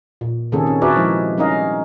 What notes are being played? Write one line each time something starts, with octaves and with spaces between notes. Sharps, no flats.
A#2
C3 D#3 A#3 C#4 G#4 A4
C#4
F#4 G#4 A#4 B4 D5 E5
F3 G#3 E4
G3 C#4 D#4 A#4 D#5 F5